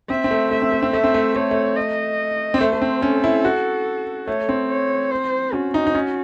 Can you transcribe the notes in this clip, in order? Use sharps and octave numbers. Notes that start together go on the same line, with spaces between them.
C4 E5
C4
A3
A3 E5
C4
A3
C4
A3 E5
C4
A3
A3 C#5
A3
D#5
C4
A3 C5
A3
C4
C#4 A4
E4
F#4
A3 C#5
C4
C#5
C5
C#4 F#4
D#4
D#4
C#4